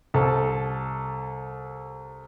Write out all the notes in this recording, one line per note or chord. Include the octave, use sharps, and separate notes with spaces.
C2 A4